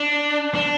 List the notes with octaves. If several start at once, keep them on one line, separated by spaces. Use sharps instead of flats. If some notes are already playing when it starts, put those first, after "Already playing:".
Already playing: D4
D4